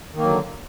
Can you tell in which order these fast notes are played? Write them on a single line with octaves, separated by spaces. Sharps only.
D#3 A#3 F#3 D3